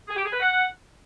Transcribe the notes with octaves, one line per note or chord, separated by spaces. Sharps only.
G#4
G4
G#4
B4
F#5